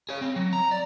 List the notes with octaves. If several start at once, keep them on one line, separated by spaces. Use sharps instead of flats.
G#4 C#5
C4
F#3
A#5
D5